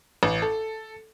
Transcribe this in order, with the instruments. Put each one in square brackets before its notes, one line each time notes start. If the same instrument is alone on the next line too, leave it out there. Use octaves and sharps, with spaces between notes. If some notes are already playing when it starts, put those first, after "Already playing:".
[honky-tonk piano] A1
A4